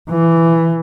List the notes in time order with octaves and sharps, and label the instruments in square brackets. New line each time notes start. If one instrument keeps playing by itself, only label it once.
[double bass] E3